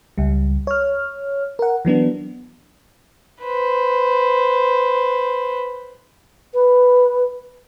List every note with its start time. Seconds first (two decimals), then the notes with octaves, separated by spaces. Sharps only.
0.18 C#2 G3
0.67 C#5 F6
1.59 A#4 F#5
1.85 E3 F#3 B3 D4
3.43 B4 C5
6.54 B4